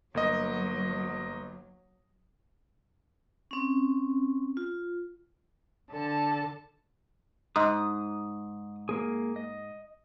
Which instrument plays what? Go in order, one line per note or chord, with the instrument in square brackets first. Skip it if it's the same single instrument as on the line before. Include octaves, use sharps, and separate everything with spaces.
[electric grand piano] G1 A#3 D#5 [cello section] F#3
[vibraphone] C4 C#4
F4
[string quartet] D3 A4 A5
[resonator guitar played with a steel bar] G#2 [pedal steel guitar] D#6
[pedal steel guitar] A#3 G#4
D#5